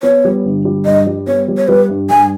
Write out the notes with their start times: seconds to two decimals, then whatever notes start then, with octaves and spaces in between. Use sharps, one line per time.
0.03 B3 C#5
0.25 G3
0.45 G1
0.65 G3
0.85 G2 D#5
1.07 G3
1.27 B3 C#5
1.48 G3
1.57 C#5
1.68 G3 B4
1.89 G2
2.10 G2 G#5